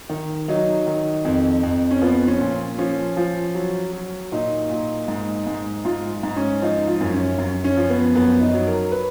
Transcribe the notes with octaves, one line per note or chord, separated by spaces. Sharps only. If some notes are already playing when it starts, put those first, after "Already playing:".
D#3
F#3 D#4
D#3
F2
F2
C#4
F3 B3
C#4
A#2
F3 C#4
F3
F#3
F#3
A#2 D#4
A#2
G#2
G#2
G#2 F4
G#2
C#4
F3 D#4
F4
F#2
C#4
F#2
C#4
F3
B3
F#2 B3
D#4
F#3
A#4
B4